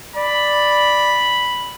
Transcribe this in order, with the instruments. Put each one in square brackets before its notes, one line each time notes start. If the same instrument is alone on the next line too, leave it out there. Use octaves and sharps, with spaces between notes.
[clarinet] D5 [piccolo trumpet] B5